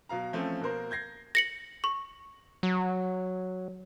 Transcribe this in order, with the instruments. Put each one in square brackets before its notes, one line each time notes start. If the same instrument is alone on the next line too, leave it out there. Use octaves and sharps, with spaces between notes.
[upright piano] B2 F#3 F5 A#5
E3 F3 A3 C4 C#4
B2 A#3 A#4 C5
G6 G#6 A#6 C7
[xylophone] A#6 C#7 F#7
C#6
[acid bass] F#3